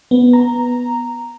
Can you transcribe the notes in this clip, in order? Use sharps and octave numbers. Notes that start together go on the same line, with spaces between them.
B3
A#5